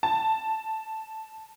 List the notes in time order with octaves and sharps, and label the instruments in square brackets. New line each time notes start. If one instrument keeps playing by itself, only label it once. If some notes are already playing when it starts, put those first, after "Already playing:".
[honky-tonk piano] A5